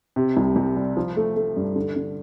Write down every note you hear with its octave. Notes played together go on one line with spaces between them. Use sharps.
C3
C2
C2
G3
F3
A3
A3
G2
D3
D3